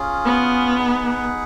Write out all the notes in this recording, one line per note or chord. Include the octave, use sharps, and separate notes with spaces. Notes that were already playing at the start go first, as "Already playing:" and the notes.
Already playing: C#4 F4 G#4
B3
D#4 G#4 B4 F#5